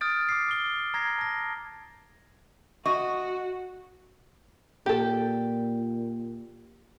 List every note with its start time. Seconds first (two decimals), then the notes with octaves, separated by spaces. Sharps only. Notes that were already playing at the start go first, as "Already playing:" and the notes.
0.01 D#6 F6 G6 A6 D7
0.29 D6 C7
0.48 D6 G7
0.94 A#5 G#6 A#6 C7
1.18 A5 A#6
2.86 F#4 D#5 C#6
4.86 A#2 G4 A4